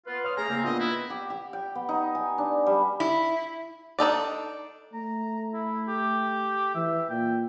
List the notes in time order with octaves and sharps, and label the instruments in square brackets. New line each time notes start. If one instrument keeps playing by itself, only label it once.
[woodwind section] B3 F4 [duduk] B4
[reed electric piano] C#5 C6 D#6 [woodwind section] F6
[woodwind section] C#3 A3 A#3 [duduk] G#4 [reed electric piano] G#5 [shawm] A#5
[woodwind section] E2 C#3 C4 [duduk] A#3
[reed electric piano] A#3 D4 F4 [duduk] B3 [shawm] D#5
[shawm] E4 [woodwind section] B4
[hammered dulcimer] G4
G4
G5
B3
D#4
G#5
D4
G3
[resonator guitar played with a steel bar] E4
[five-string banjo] D4 D#4 A4 D5
[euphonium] A3 [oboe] A#5
[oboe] E4
G4
[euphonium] E3 [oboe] E5
[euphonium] A#2 [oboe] G5